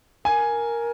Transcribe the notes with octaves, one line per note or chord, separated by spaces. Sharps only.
A#4 G#5